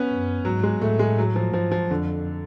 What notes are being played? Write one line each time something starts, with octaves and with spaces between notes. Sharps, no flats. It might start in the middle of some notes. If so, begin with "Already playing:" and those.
Already playing: B3 C#4
F#2
G#2 F#3
G#3
A2 A3
G#3
F#3
F3
G#2 F3
F3
F2 D3